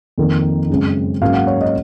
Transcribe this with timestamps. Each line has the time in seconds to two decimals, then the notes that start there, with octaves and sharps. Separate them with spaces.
0.18 F2 D#3 A#3 D#4
0.69 F#2 C#3 G#3 C4
1.22 G#2 F#3 A#3 C#4 F5
1.34 F#5
1.47 C#5
1.61 D#5